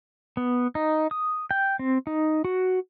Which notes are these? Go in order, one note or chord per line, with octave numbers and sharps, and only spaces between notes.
B3
D#4
D#6
G5
C4
D#4
F#4